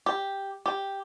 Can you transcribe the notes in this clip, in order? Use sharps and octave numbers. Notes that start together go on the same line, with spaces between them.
G4
G4